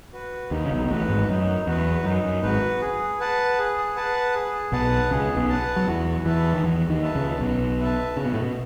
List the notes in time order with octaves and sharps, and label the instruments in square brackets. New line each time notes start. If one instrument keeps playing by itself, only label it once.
[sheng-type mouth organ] F#4 B4
[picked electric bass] D#2 D#3 [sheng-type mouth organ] D#4
[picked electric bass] C#3
B1 B2
B2
[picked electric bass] A1 A2 [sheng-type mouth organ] F#4 B4
[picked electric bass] G#1 G#2
[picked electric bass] F#2 [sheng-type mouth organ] D#4
[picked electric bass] E2 [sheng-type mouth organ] F#4 B4
[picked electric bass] F#2 [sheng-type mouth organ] D#4
[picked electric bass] F#2
[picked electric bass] G#1 G#2 [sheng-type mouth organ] F#4 B4
[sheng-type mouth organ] G#4
B4 F#5 A5
G#4
B4 F#5 A5
G#4
[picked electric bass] B1 B2 [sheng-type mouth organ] B4 F#5 A5
[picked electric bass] C#2 C#3 [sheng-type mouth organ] G#4
[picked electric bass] B1 B2
[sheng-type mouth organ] B4 F#5 A5
[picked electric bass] F#3
[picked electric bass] E2 E3 [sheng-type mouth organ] F#4
[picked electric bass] E2 E3 [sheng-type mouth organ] B4 E5 A5
[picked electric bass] D#3
[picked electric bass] E2 E3 [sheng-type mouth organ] F#4
[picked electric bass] D#2 D#3
[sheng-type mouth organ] B4 E5 A5
[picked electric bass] C#2 C#3
[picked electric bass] B1 B2 [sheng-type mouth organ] F#4
[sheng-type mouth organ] B4 E5 A5
[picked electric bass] C#3 [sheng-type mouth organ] F#4
[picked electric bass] B2
A2
B2